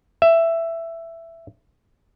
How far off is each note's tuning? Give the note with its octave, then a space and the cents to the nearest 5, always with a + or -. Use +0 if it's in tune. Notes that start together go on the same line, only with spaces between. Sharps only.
E5 +10